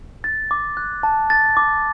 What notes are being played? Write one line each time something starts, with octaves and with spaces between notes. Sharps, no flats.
A6
D6
F#6
A5
A6
D6